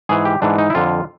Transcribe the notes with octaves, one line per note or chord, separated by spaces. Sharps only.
G#2 E3 G#4
G4
G#2 E3 D4
D#4
E4
F2 D3 F4